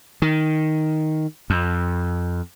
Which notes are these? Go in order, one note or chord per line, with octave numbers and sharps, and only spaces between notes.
D#3
F2